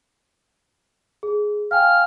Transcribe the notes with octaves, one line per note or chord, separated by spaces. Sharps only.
G#4
F5 G5 G#5 F6